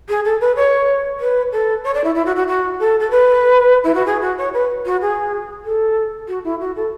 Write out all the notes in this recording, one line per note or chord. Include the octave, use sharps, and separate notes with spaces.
G#4
A4
B4
C#5
B4
A4
C#5
D5
E4
E4
F#4
F#4
F#4
A4
A4
B4
E4
F#4
G#4
F#4
C#5
B4
F#4
G#4
A4
F#4
E4
F#4
A4